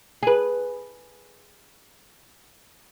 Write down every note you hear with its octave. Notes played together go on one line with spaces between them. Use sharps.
G#4 B4